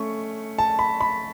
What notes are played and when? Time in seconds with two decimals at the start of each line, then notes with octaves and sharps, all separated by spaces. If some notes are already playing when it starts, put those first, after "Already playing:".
Already playing: A3 C#4 C#6
0.59 A5
0.79 B5
1.01 B5